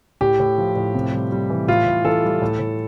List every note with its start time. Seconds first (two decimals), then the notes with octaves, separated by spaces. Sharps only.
0.21 A2 G4
0.40 A2
0.58 F3
0.76 A2
0.95 C3
1.13 G3
1.32 G3
1.50 E3
1.68 A2 F4
1.86 A2
2.05 E3 A4
2.23 G3
2.42 A2
2.59 A2